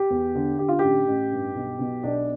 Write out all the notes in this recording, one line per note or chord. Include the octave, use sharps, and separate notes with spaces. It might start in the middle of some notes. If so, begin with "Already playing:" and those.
Already playing: G4
E2
D3
D3 G4
F4
A1 G4
A1
G2
B1
B2
B1 D4